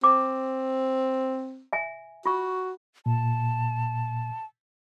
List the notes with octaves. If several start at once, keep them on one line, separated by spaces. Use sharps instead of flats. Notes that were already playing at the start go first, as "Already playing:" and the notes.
C4 D6
E5 G#5
F4 F#4 C#6
A#2 A5